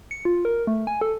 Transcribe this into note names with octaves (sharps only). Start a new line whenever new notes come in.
C#7
F4
A#4
A3
G#5
A4